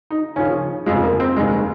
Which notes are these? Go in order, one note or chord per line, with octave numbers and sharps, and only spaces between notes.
D#4
D#2 C#3 F3 C#4
F1 F2 C#3 F3 G#3
A#3
C4
F1 D#2 D#3 G#3